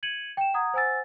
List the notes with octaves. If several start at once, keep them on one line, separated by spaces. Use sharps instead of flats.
G#6 C#7 D#7 F#7
G5 E7
F#5 A#5 D#6 G#6
C5 F#5 G#5 E6 A6